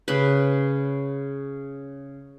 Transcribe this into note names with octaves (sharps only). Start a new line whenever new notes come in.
C#3 B4